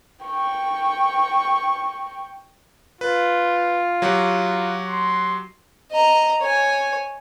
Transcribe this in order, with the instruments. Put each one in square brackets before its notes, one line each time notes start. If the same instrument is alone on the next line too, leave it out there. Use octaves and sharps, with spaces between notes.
[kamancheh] G5 C#6
[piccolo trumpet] F4 [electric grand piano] B4
[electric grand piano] F#3 F#4 G4
[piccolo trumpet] C6
[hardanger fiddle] D#5 A#5
C#5 G#5